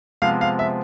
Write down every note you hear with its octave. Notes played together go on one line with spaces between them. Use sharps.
C3 F3 G#3 B3 F5
F5
E5